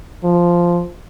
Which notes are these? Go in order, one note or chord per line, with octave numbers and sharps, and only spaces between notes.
F3